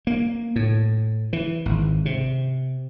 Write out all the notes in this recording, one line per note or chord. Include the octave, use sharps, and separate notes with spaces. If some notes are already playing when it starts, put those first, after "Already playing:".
A#3
A2
E3
G#1
C3